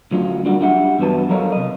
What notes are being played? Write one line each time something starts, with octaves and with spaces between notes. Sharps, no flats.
D2 F#3 C#4 F4
G3 A#3 D4 F#4
D4 G4 E5 F#5
E2 G2 F#3 B4 A5
F#3 A4 A#4 C#5 D#5 F5
C3 D#5